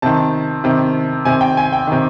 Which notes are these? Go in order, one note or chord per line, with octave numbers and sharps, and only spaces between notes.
C3 D#3 A5
C3 D#3
C3 D#3 G#5
G5
G#5
G5
C3 D#3